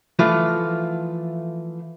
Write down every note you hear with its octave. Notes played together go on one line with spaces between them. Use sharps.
E3 F3 A3 F4